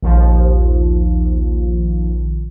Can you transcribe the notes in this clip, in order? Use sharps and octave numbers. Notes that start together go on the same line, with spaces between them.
A#1 D#2 F3